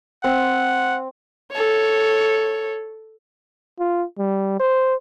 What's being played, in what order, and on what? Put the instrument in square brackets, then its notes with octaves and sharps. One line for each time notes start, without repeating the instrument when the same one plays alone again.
[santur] C4 [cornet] F#5
[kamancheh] A4 C#5
[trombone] F4
G3
C5